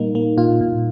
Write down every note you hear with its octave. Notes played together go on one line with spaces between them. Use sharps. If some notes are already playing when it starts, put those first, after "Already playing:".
Already playing: A#2 G3 A#3 D#4
A#3
A#2 F4
A#2